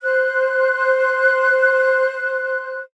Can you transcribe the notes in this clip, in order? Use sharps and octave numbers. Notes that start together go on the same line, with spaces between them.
C5 F#6